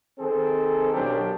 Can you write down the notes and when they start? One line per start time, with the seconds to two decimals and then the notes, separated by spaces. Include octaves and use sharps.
0.18 D#3 C4 G#4 A4
0.93 B1 F#3 D4 G4 A#4